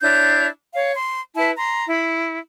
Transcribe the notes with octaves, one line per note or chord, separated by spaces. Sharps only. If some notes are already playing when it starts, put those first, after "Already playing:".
D4 E4 C#5 G6
C#5 F5
C6
E4 B4 E5 A5
A#5 C6
E4